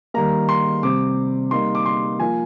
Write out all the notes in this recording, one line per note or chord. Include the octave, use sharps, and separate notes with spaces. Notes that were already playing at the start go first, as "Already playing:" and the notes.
D#3 G3 A#3 A#5
C6
C3 G3 C4 D6
G3 A#3 D#4 C6
D6
C6
F3 A#3 F4 G#5